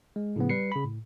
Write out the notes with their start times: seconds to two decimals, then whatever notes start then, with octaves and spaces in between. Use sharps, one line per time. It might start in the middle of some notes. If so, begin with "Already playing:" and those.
0.16 G#3
0.36 A2 C#3 F3 B3
0.49 G3 B4 C7 C#7
0.72 C#3 B5
0.85 A2